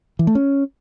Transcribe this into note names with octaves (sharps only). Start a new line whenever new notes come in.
E3
A3
C#4